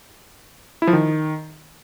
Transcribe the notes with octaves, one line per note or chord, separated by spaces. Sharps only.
E4
F3
D#3